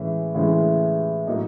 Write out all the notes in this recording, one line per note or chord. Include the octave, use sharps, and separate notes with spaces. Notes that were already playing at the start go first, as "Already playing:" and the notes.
Already playing: A2 E3 G#3 C#4
A2 E3 G#3 C#4
A2 F#3 A#3 D#4